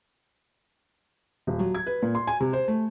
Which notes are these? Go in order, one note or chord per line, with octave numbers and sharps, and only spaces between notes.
D#1
F#3
G#6
B4
A#2
C6
G#5
C3
C5
A3